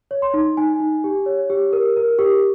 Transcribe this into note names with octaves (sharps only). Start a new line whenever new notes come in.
C#5
C6
D#4
D#4 G#5
D#4
G4
C#5
G4
A#4
A#4
G4